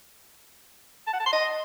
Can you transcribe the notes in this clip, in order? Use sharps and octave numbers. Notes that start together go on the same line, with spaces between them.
A5
F#5
A5
C6
D#5